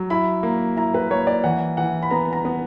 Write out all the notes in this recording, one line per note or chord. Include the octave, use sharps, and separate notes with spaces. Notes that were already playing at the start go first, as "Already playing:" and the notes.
Already playing: F#3
E4 B5
A#3
E4 A#5
B4
A#3 C#5
D5
E3 F#5
E3 F#5
B5
B3 A#5
A#5
B3